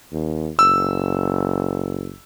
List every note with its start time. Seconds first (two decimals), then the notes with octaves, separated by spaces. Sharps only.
0.12 D#2
0.59 F#1 E6